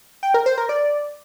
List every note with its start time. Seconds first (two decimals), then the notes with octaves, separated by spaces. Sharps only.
0.23 G5
0.34 A#4
0.46 C5
0.58 A#4
0.69 D5